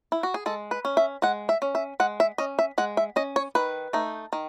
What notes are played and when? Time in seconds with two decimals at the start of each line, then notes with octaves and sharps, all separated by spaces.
0.12 E4
0.23 F#4
0.34 G#4
0.46 G#3 A4
0.71 B4
0.85 C#4
0.97 E5
1.22 G#3 F#5
1.49 E5
1.62 C#4
1.75 E5
2.00 G#3 F#5
2.20 E5
2.38 C#4 D#5
2.59 E5
2.78 G#3 F#5
2.97 E5
3.16 C#4 D#5
3.36 C#5
3.55 D#3 B4
3.93 A3 D#4
4.33 D#3